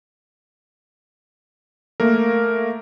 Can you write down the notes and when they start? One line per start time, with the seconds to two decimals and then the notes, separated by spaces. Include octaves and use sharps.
2.00 A3 A#3 A#4